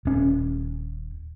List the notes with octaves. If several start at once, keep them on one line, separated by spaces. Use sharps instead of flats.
D#1 C#4